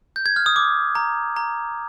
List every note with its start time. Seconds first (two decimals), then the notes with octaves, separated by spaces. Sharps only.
0.16 G6
0.26 G#6
0.36 F6
0.46 D#6
0.56 D6
0.95 A#5
1.36 A#5